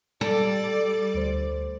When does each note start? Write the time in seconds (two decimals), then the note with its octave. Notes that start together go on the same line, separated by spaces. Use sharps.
0.21 G3 A4 D5
1.14 D2 C5